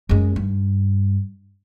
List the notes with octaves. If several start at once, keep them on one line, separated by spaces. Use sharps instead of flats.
F#2 G#3
G2